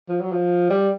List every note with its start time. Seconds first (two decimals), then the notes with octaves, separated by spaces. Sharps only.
0.09 F3
0.21 F#3
0.32 F3
0.70 G3